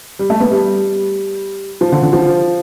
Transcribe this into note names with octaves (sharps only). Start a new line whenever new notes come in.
G3
A3
B3
G3
F3
D3
D3
F3